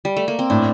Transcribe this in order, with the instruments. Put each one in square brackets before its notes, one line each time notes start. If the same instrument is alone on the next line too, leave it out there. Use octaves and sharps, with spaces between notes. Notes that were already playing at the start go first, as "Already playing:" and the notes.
[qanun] G3
A3
A#3
C4
[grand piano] A2 [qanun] D4